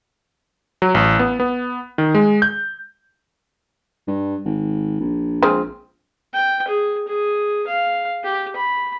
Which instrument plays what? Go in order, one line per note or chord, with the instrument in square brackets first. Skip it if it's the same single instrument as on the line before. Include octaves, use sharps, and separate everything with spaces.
[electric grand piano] F#3
A1
B3
B3
D#3
G#3
G6
[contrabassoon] G2
G#1
A#1
[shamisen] F3 G#3 C4
[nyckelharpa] G5
G#4
G#4
F5
G4
B5